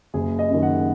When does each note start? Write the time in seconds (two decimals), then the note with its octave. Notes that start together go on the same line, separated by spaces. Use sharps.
0.14 F#1 G#4
0.39 D#5
0.50 F#2 D#3
0.63 F#5